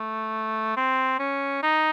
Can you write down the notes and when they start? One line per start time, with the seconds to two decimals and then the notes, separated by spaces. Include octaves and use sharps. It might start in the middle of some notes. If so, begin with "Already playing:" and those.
Already playing: A3
0.77 C4
1.19 C#4
1.63 D#4